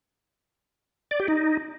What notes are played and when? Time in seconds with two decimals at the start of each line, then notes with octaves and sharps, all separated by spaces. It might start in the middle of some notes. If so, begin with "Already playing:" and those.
1.11 D5
1.20 G4
1.28 D#4